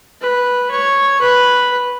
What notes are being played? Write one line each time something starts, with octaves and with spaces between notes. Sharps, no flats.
B4
C#5
B4